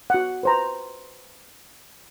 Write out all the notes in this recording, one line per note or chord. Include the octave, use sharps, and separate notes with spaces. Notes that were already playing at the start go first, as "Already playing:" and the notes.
F#4 F#5
B4 C5 A#5